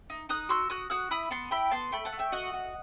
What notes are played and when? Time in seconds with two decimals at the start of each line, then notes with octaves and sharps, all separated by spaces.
0.10 D#4
0.29 D#4 D#6 F#6
0.49 F#4 C6 E6
0.70 F#4 D#6 F#6
0.90 F#4 D#6 F#6
1.11 E4 B5 D#6
1.31 B3 A5 C6
1.51 E4 G5 B5
1.71 B3 A5 C6
1.92 A3 G5 B5
2.05 F#5 A5
2.12 A3
2.19 E5 G5
2.32 F#4 D#5 F#5
2.53 F#4